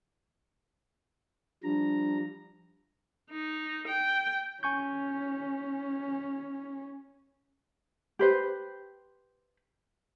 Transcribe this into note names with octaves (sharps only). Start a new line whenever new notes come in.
F3 G3 D4 A#5
D#4
G5
C#4 G#5 C#6 G6
G4 B4 C5